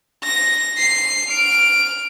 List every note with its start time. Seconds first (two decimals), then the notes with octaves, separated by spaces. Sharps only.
0.23 A#6
0.78 C7
1.30 F6 D7